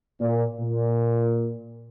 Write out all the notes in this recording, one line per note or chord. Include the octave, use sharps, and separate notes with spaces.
A#2
A#2